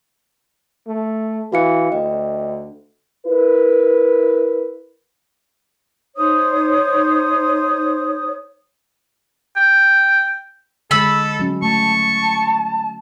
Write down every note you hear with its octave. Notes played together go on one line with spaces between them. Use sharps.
A3
E3 F#4 F5 C#7
D2 D#5 G5
E4 A#4 B4
D#4 C5 C#5 D#6
G5
D3 G#3 A4 B5 E6
F#3 C#4
A3 A5 C#6